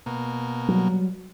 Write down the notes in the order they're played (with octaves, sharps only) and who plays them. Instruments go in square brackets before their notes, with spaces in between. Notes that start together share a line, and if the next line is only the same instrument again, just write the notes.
[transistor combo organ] B2 A#3
[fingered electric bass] F#3 G3